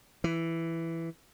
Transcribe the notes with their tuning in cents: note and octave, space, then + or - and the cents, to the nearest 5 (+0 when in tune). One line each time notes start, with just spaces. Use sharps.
E3 +5